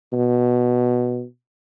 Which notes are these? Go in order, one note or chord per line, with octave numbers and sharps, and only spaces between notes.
B2